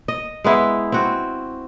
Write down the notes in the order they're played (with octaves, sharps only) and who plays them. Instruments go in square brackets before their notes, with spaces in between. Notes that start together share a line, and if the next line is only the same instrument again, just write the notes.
[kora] D#5
G#3 B3 E4
C4 F#4